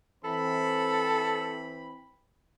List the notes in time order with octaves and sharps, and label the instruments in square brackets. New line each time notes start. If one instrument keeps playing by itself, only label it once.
[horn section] E3 C4 B5 [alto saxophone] A4